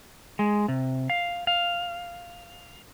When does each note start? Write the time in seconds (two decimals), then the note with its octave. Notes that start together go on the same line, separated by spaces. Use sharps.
0.39 G#3
0.68 C3
1.10 F5
1.47 F5